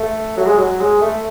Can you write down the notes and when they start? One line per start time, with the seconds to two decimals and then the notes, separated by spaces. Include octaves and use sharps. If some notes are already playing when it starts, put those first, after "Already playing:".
Already playing: A3
0.37 F#3
0.46 G#3
0.57 F#3
0.80 G#3
1.01 A3